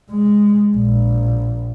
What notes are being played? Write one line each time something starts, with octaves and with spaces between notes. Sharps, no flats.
G#3
A#1